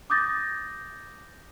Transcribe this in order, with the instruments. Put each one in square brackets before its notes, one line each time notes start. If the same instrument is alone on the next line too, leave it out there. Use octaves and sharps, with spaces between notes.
[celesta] D6 D#6 G6 A6 A#6